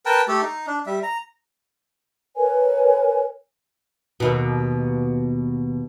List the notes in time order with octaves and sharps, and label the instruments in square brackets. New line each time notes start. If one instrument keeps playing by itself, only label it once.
[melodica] A#4 B4 G5 A5
A3 G4 A4
D#4
D4
G3 E5
A#5
[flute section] A#4 B4 C#5 G#5
[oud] D#2 B2